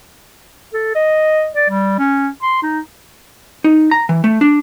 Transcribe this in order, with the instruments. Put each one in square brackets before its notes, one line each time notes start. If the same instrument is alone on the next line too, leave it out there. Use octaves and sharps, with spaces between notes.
[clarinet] A4
D#5
D5
G3
C#4
C6
D#4
[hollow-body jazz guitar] D#4
A#5
E3
A3
D4